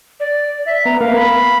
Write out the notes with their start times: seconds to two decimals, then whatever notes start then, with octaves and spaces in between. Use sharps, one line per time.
0.20 D5
0.66 E5
0.85 B3 A#5
1.01 A#3 B3 A#4 F5
1.17 B5